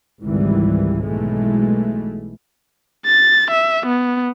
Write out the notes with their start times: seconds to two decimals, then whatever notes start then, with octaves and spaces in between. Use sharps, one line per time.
0.23 G#1 C#2 G#2 D#3 E3 G3
1.02 B1 E3 G#3 A3
3.06 A6
3.51 E5
3.86 B3